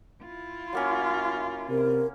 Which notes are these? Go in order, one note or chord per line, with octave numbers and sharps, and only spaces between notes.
E4 F4
F#3 A#3 C#4
C3 A#4